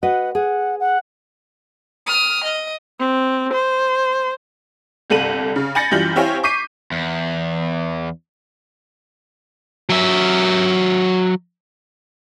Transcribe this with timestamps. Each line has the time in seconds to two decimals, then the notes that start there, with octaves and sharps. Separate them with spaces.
0.03 F#4 B4 D#5 F#5
0.35 G#4 F#5
0.80 F#5
2.07 D#6 F6
2.44 D#5
2.99 C4
3.53 C5
5.10 G1 C2 A4 D#7 F#7
5.56 C#3
5.75 G#5 B5 G6 A6 A#6 C#7
5.91 F#2 E3 G3 F4 G6 F#7
6.16 C4 E4 G4 C#5 F5 G#5
6.43 C#6 D6 G6 B6 C7 D#7
6.92 E2
9.89 F#3 E5